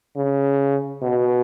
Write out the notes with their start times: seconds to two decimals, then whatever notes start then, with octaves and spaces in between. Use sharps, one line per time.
0.16 C#3
1.02 B2